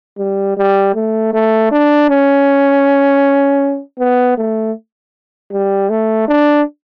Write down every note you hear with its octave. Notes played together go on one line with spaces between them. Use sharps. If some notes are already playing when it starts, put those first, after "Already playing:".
G3
G3
A3
A3
D4
C#4
B3
A3
G3
A3
D4